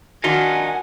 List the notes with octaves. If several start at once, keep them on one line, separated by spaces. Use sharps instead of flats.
D#3 D4 D#4 F4 F#4 F#5 G#5